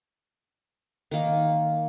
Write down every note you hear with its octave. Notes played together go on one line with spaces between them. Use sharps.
D#3 A#3